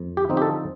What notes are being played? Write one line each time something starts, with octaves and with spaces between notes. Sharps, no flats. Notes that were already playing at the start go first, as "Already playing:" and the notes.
Already playing: F2
G4
D3 F3 C4 D#4
G4
A4